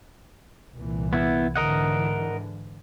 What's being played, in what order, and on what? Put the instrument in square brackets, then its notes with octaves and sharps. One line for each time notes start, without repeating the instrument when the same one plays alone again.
[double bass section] C2 A#2 E3
[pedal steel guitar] B3 E4
[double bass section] G#2 D3 E3 [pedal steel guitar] A#4 D#5 F#5